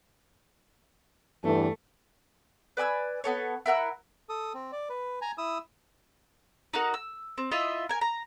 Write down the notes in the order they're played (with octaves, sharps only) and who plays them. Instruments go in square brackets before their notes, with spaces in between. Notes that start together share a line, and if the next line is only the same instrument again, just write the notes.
[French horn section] E2 G2 [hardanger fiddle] A3
[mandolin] B4 D5 G#5 E6
B3 A4 C#5
E4 A#4 F#5 E6
[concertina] A4 D#6
C4
D5
B4
G#5 A#5
E4 D#6 E6
[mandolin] D#4 F#4 A#4
E6
C4
E4 F4 D#5 E5
A#4 G#5
A#5